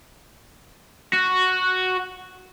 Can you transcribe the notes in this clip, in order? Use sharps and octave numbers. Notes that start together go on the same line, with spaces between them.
F#4